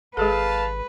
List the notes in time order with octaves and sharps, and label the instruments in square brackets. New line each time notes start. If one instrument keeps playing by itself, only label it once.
[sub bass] G#1 [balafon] G#3 G#4 A4 [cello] B4 [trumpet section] F5 A5